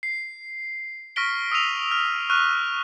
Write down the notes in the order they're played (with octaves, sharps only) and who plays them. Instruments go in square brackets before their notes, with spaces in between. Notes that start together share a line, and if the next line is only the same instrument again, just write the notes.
[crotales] C7
C#6 F6 A#6 B6 D7 G7
D#6 E6 D7 D#7 F7
F6
C#6 F6 F#6 D#7